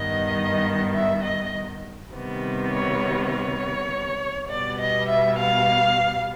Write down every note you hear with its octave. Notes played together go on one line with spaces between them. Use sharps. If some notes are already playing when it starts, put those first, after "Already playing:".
Already playing: G2 D#3 G3 B3 D#5
E5
D#5
C3 D#3 G3 B3
C#5
C#5
B2 G3 B3 D5
D#5
E5
F5